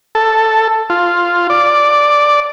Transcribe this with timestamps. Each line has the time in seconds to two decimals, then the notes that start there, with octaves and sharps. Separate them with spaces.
0.15 A4
0.90 F4
1.50 D5